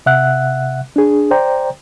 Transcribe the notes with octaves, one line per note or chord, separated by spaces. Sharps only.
C3 E5 F#5 F#6
D4 G#4
C5 D5 G5 A#5